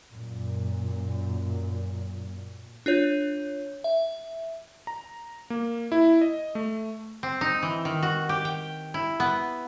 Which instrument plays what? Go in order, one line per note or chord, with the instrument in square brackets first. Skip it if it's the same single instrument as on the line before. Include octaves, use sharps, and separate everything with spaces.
[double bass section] F#2 A#2
[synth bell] D4 F4 C#5 G6
E5
[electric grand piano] A#5
A#3
E4
D#5
A3
[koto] C4
D#4
E3
D#3
F#4
G4
G5
E4
B3